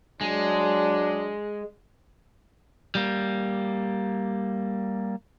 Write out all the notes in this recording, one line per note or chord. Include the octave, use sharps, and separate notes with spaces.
F#3 G#3 D4
G3 A#3